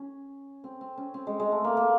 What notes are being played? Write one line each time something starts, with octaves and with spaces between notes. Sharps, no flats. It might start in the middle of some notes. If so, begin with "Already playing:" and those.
Already playing: C#4
C4
C4
C#4
C4
G#3
G#3
A3
A#3
A#3